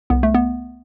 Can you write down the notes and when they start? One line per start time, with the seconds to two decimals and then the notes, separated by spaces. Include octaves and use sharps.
0.10 C2 B3
0.23 A3
0.34 B3